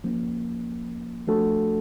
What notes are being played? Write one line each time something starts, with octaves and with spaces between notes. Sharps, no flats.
F3 A#3 C#4
F3 A3 D4 F#4 A4